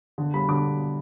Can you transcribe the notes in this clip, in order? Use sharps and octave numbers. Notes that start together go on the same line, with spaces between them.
D3
G3 B5
D3 D6